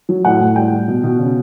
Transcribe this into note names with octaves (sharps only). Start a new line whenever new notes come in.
F#3
A2 F#5
A2
G3 G5
G3
B2
B2
C#3